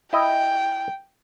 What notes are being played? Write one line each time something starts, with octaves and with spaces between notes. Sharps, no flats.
E4 D#5 G5